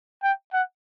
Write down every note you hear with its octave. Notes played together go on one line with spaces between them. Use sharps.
G5
F#5